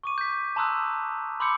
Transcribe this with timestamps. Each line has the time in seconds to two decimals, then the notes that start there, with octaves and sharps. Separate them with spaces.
0.04 C#6 D6 D#7
0.18 G6 B6
0.56 A5 A#5 C6 D#6 E6 F#6
1.40 B5 C6 D6 E6 G6 C#7